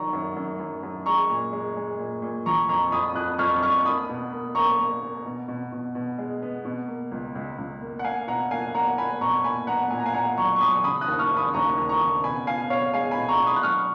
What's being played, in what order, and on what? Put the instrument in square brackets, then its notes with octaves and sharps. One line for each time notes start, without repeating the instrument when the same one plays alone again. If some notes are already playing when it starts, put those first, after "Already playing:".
Already playing: [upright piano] D#3 F#3 A#5 C#6
F#2
F#2
F#2
F#2
G#3 A#5 C#6
A#2
G#3
G#3
A#2
A#2
F3 A#5 C#6
F2 A#5 C#6
F2 B5 D#6
F2 D#6 F#6
F2 C#6 F6
F2 C#6 F6
A#3 B5 D#6
B2
A#3
A#3 A#5 C#6
A#3
A#3
B2
B2
B2
B2
G#3
B3
B2
A#3
C#2
C#2
C#2
A#3
F#5
A#3 F5 G#5
B2 F#5 A#5
A#3 F5 G#5
A#3 F#5 A#5
A#3 G#5 B5
B2 A#5 C#6
A#2 G#5 B5
B3 F#5 A#5
A#2 G#5
A#5
F5 G#5
A#2 F#5 A#5
F#3 A#5 C#6
C#6
F#3 B5 D#6
C#3 B5 D#6
D#6 F#6
D#2
C#6 F6
C#3
B5 D#6
D#2 A#5 C#6
D#2
A#5 C#6
C#3
B2 G#5 B5
B3 F5 G#5
B2 C#5 F5
G#3 F5 G#5
G#5 B5
B2
A#5 C#6
B2
B5 D#6
F#6
F#3 C#6 F6